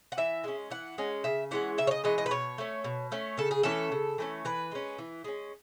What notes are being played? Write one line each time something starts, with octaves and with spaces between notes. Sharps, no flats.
F#5
E3 E5
G#3 C#4
E3 F#5
G#3 C#4
C#3 E5
E3 G#3 C#4 F#5
C#3 E5
C#5
D#5
E3 G#3 C#4 D#5
D#5
B4
B2 C#5
A3 C#4
B2
A3 C#4
C#3 A4
G#4
E3 A3 C#4 A4
C#3
E3 A3 C#4
E3 B4
G#3 C#4
E3
G#3 C#4